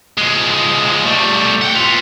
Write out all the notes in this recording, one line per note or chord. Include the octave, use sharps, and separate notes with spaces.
F3 G#3
G3 A3
F#5 G5
B3 F4